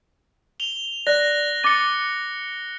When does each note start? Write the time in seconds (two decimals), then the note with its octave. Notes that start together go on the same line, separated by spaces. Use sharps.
0.60 F7 G7
1.07 D5 F#6 A#6
1.64 D6 A6 C#7 D#7 G7